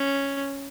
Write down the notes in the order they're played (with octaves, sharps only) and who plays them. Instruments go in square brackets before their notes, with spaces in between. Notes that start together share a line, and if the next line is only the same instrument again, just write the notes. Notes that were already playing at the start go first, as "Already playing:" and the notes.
Already playing: [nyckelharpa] C#4